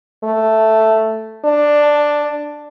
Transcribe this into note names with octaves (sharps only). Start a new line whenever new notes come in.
A3
D4